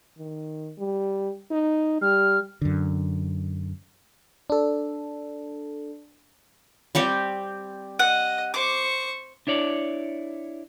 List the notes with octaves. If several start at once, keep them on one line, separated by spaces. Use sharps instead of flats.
D#3
G3
D#4
G3 F6
F#2 D3
D4 A4
G3 C4 G4
D#5 F#5
C5 C#6 D6
D4 E4 C#5 D5